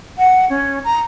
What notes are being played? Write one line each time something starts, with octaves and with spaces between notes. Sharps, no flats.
F#5
C#4
A#5